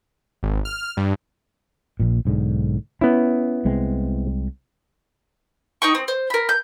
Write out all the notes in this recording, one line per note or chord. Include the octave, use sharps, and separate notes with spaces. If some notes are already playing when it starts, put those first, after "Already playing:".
G#1
F6
G2
A#1 A#2
B1 G#2 D3
B3 C#4 E4
C2 G#3 C4
D#4 G5 C#6
C4
C5
A#4 B5
G6